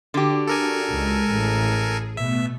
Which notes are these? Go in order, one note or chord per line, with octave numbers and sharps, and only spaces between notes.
D3 D4 F#4 G4
A4 A#4 G#5
C#2 G#3
A1 G#4
B2 A3 B3 E5